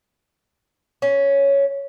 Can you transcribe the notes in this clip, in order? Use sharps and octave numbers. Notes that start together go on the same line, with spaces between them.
C#4